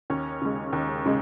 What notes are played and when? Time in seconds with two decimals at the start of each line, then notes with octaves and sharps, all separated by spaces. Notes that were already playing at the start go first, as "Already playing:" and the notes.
0.10 D#2 C#4
0.42 C#3 G#3
0.73 D#2
1.06 C#3 G#3